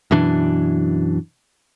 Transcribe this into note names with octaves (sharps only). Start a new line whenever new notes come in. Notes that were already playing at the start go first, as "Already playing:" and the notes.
F#2 B2 E3 D4